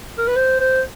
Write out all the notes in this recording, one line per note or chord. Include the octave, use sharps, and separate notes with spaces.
A#4
B4
C5
C5